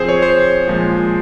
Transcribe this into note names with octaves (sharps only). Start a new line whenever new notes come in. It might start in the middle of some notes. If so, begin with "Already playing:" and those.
Already playing: F3 C4 G#4 C5
C#5
C5
A#2 F3 G#3